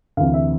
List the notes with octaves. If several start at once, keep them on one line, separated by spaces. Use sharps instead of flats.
D2 C3 E3 F5
E5